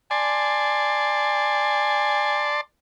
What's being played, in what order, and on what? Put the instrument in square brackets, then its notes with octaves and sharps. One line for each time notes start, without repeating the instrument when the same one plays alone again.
[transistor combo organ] D5 A5 C6 [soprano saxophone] G#5